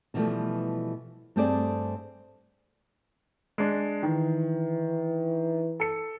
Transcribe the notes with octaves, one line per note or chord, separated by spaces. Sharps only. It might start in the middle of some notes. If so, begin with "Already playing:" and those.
B2 D3 E3 F3 G3 A3
G2 A3 C4 G4 G#4 D5
G#3 D4
D#3 E3
A4 C#7